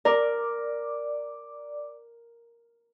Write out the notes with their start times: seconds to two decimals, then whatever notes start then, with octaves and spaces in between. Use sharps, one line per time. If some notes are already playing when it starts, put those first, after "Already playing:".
0.05 A#4 D5 D6